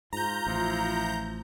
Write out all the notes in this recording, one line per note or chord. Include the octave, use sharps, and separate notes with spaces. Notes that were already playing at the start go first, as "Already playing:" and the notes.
G#2 F4 A#5 G6
A1 F3 E4